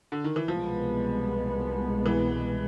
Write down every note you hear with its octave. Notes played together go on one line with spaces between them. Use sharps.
D3
D#3
E3
C2 B2 F3 G#3 B3
E3